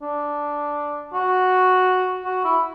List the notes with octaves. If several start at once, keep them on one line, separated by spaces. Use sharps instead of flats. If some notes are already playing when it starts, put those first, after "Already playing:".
D4
F#4
F#4
E4